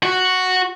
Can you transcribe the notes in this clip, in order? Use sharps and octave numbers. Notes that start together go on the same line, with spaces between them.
F#4